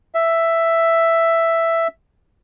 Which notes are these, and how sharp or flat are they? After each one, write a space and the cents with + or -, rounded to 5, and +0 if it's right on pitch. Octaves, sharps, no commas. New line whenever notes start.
E5 +5